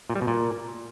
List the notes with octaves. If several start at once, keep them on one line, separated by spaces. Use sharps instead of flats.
A#2
G3
B2
A#2